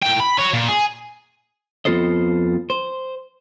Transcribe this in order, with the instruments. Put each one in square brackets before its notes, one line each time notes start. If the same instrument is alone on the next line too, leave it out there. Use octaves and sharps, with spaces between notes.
[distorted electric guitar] A2 G5
B5
F#4 C#5
A#2
G#4
[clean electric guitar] F2 B3 F4 A4 C5 D#5
C5